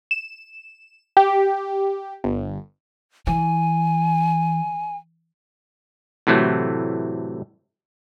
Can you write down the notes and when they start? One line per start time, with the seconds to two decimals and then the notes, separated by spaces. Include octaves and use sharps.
0.11 E7
1.17 G4
2.24 G1
3.27 E3 G#5
6.27 A2 C3 E3 F#3 A3